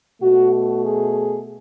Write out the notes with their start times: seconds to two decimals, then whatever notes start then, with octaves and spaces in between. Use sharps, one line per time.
0.22 B2 A3 F#4
0.52 F#4
0.84 G#4